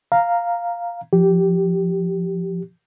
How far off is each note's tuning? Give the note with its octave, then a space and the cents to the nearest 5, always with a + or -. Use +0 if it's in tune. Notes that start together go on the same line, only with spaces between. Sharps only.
F5 +0 A#5 -5
F3 +0 G4 -10